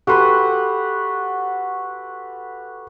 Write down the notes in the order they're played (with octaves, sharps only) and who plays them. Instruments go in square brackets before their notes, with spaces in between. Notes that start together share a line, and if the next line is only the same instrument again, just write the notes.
[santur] F#4 B4 [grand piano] G4 A4 C6